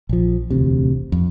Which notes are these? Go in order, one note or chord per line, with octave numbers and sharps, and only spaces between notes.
A#1 F3
E1 A1 D2 C3
F2